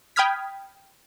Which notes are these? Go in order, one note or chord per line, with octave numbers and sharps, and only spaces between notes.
G5 B5 D#6 F6 G#6 B6